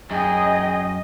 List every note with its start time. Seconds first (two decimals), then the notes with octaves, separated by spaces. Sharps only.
0.11 F#2 G#4 D#5 G5